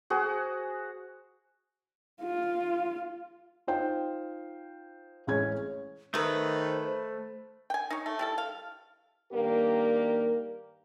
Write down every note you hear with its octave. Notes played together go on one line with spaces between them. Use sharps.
F#4 G#4 C5
F4
D#4 F4 C5 G5
A1 G#3 C#4 G#6
D#3 A3 B4 C5 D#5
G5 G#5
D#4 C#5
A3
G3 E4 A4
F5
G2 D#3 A#3 G4 A#4 D5